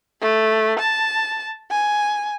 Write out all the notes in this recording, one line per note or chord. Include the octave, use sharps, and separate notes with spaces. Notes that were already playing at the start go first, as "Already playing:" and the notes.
A3
A5
G#5